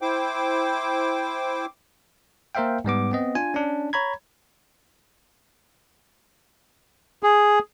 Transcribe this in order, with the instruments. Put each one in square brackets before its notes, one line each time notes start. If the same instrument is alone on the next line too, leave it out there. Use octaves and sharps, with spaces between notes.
[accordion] E4 C5 G5 D6
[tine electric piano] A#3 A#4 C5 E5 F5 G5
G#2 G3 B3 D6
B3 C4 D#5
D4 F4 G#5
C#4 D4
C#5 A#5 B5 G#6
[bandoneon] G#4